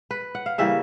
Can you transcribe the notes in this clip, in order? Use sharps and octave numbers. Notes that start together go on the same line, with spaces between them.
B4
F#5
F5
C#3 E3 G3 A#3 E5